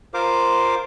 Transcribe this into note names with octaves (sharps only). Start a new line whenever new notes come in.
F4 A#4 C5 F5 D6